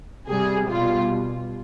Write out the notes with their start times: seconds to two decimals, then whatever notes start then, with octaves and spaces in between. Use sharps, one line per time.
0.28 C3 G3 G#4
0.69 B2 G3 F4